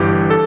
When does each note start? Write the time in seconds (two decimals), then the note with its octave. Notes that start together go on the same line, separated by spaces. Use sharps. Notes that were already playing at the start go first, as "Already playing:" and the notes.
Already playing: G1 G2 E3 G4
0.30 A4